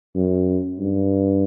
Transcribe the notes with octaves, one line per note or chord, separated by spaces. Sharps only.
F#2
G2